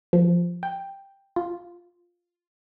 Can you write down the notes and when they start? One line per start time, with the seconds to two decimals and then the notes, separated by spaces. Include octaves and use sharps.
0.13 F3
0.63 G5
1.36 F4